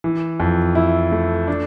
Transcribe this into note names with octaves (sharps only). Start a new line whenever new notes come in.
E3
F2
E4
A3
D4